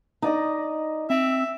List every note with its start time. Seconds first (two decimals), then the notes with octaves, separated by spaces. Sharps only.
0.22 D#4 D5 D#5
1.10 C4 E5